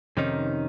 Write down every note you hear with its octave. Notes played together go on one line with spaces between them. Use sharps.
F2 C3 D#3 C#4 D#4